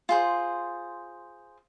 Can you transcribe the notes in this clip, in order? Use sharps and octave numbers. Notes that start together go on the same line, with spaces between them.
F4 G#4 C5